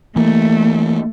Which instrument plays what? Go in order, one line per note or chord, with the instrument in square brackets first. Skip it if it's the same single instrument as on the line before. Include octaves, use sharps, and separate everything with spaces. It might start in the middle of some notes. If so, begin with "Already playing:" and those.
[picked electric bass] E3 A#3 [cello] A3